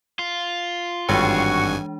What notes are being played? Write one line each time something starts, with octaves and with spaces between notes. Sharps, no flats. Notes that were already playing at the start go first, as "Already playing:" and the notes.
F4
G#1 G2 E3 G#3 D4 F#4 G#5 C#6